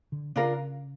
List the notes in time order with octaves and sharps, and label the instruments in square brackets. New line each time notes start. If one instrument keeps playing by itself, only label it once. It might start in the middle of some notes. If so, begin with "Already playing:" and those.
[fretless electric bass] D3
[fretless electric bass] C#3 [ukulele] D4 F4 A#4